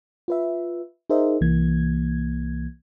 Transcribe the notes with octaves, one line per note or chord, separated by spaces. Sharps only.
F4 B4 E5
D#4 G#4 A#4 C5 D#5 E5
C2 E3 A#3 G#6